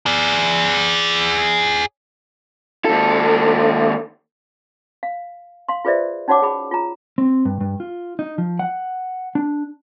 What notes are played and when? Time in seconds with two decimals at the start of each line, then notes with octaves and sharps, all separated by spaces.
0.06 G#4 D5
2.85 D#2 A4
5.03 F5
5.68 F5 C6
5.85 F4 G#4 B4 C5 D5 E5
6.28 C#4 D#4 F#4 C#5 F#5 D6
6.42 G#4 B5
6.71 F4 A#5
7.18 C4
7.45 G2
7.61 G2
7.80 F4
8.19 D#4
8.38 F3
8.59 F#5
9.35 D4